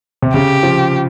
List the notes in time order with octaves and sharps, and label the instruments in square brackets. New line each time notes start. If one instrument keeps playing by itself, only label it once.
[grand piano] C3
[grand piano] C#3 [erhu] G4
[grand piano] F3